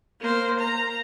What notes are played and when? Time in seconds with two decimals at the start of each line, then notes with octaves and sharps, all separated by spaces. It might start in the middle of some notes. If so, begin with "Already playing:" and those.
0.20 A#3 C5
0.59 A#5